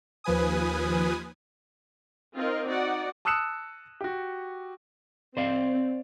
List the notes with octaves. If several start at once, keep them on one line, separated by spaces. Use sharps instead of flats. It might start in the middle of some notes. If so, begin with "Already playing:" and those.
D#2 F3 B4 G#5 D#6
C4 D#4 F4 A#4 D#5
D#4 F#4 D5 F#5
A5 D#6 E6 F#6 C#7 E7
F#4 G4
C4 C5 D5 F5